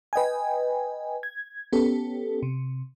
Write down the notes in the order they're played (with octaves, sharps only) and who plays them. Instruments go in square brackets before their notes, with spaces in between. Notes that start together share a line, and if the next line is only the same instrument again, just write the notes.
[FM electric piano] B4 D#5 G5 G#5
G#6
B3 C#4 G4 A4
C3